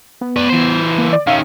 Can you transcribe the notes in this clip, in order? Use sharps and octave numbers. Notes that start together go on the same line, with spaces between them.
B3
B4 D5
E3 C5
A#3
D5
D#3 C#4 E5 F5